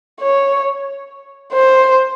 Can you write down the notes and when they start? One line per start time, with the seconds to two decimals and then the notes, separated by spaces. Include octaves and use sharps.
0.21 C#5
1.53 C5